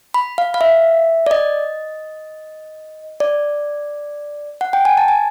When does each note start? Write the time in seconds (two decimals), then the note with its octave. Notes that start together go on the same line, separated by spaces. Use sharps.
0.14 B5
0.38 F5
0.54 F5
0.61 E5
1.26 D5
1.31 D#5
3.20 D5
4.61 F#5
4.73 G5
4.85 G#5
4.97 A5
5.08 G#5